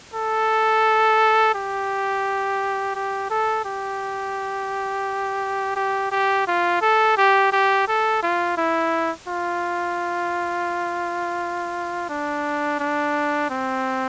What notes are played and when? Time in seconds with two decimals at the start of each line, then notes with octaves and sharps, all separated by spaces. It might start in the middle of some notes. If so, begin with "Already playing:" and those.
0.14 A4
1.55 G4
2.96 G4
3.30 A4
3.65 G4
5.76 G4
6.12 G4
6.47 F4
6.82 A4
7.17 G4
7.52 G4
7.88 A4
8.23 F4
8.58 E4
9.28 F4
12.09 D4
12.80 D4
13.50 C4